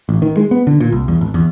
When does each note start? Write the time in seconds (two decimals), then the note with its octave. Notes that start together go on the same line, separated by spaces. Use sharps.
0.09 A1
0.22 D#3
0.37 G#3
0.51 B3
0.67 D3
0.80 A#2
0.92 C2
1.08 E2
1.21 G#1
1.34 E2